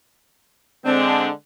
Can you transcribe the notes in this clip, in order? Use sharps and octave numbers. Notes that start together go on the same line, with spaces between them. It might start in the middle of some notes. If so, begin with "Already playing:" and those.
D3 G#3 C4 D4